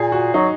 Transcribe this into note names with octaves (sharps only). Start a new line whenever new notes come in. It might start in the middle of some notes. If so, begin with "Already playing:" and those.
Already playing: A#2 G#4
F#4
F#3 D#4